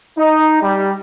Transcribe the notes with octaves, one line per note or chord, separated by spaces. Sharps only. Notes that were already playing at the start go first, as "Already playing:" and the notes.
D#4
G3